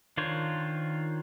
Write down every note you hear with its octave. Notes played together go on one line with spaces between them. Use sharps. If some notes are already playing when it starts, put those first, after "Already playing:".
D#3 D4 F4 C5 C#5